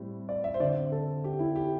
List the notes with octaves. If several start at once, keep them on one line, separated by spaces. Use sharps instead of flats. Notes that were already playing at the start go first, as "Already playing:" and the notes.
Already playing: A2 G3 C4
D5
E5
C5
D3 C4 D5
A4
G4
E4
G4